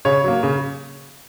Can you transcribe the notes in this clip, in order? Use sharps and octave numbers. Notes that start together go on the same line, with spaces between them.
C#3 C#5
F#3 A#3
C#3